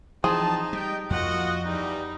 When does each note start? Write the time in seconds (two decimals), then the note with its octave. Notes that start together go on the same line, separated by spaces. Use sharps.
0.24 E3 F3 C4 D#4 G#4 A5
0.73 G3 D#5 G5
1.10 F2 A#3 F4 F#4 D#5 F#5
1.64 E2 G3 D#4